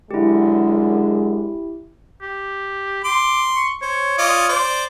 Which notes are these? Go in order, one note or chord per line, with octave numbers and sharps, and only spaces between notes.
F#2 D3 G#3 E4 G4
G4
C6 D6
C#6
C5 C#5
F4 D5 D#5
C5 D5